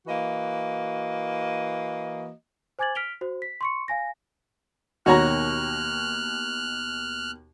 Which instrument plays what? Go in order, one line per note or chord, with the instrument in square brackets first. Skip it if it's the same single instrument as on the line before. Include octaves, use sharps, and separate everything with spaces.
[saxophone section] E3 A#3 F#4 D#5
[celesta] C5 G#5 D6 G#6 A6 F#7
F6 B6 D7 F7 G7
F#4 C5
B6
C6 C#6 C#7
F5 G#5 A#6
[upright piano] D#2 B2 D#3 [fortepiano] F#4 C#5 A#5 [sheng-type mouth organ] F6 F#6